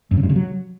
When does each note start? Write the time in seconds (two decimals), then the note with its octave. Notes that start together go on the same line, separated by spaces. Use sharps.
0.11 F#2
0.17 C#3
0.23 G2
0.30 C#3
0.36 F#3